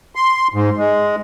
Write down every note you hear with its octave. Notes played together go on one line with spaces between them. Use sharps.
C6
G#2
G#3